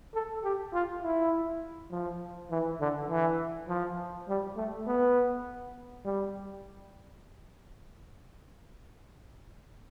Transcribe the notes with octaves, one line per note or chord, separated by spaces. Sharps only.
A4
G4
F4
E4
F3
E3
D3
E3
F3
G3
A3
B3
G3